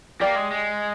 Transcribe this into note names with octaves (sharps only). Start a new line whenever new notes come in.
A#3 G4 D5 G5
G#3
G#3